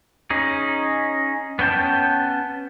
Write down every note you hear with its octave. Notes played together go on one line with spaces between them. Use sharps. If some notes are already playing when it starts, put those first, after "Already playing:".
C#4 D#4 G#4
B3 C#4 G5 A5 G6